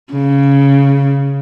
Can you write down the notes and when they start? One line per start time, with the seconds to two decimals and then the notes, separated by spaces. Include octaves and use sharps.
0.13 C#3